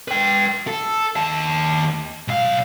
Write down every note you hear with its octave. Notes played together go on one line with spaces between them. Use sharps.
B4 G5
A4
D#2 A5
B1 F5